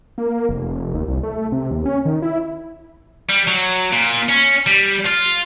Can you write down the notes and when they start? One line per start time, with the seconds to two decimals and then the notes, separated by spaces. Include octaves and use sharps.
0.18 A#3
0.49 F1
0.94 D#2
1.08 C2
1.23 A3
1.52 C3
1.71 D#2
1.86 C#4
2.05 D#3
2.22 E4
3.29 G3
3.47 F#3
3.92 A#2
4.29 C#4
4.67 G3
5.06 F4